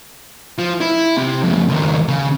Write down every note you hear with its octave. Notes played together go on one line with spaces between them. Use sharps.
F3
E4
C3
F2 C#3
C#2 D#3
C#3